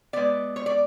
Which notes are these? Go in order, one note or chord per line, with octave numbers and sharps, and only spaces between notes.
B2 G#3 B3 D5
C#5
D5